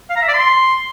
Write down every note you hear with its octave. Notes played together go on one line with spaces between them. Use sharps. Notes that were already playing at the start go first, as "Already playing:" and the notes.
F5
A#5
E5
D5
C6